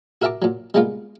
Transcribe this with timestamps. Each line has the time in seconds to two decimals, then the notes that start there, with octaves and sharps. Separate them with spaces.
0.22 F#4 A#4 E5 A5 A#5 D6
0.42 A#2 F#3
0.74 G3 G#3 A#3 B3 F4